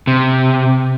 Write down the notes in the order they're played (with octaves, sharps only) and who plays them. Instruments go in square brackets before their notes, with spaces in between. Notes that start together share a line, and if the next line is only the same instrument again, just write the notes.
[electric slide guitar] C3